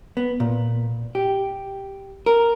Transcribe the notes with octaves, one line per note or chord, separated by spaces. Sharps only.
B3
A#2
G4
A#4